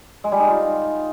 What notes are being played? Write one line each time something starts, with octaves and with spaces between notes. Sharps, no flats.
G#3
G3
D#4
F4